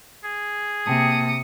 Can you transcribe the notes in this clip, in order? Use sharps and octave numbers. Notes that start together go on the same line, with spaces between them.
G#4
C3 A#3 G5 A5 D#6 C#7